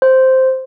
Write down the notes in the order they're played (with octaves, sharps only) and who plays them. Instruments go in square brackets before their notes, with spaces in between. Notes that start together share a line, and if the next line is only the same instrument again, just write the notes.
[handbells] C5